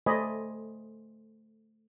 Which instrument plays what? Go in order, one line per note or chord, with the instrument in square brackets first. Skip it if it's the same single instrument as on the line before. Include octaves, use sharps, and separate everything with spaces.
[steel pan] A3 C5 D5 D#5 G#5 B5